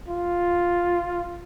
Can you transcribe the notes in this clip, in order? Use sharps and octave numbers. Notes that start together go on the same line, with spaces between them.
F4